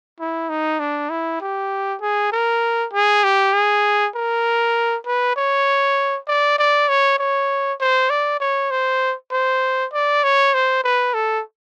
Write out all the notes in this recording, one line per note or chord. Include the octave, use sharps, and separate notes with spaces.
E4
D#4
D4
E4
G4
G#4
A#4
G#4
G4
G#4
A#4
B4
C#5
D5
D5
C#5
C#5
C5
D5
C#5
C5
C5
D5
C#5
C5
B4
A4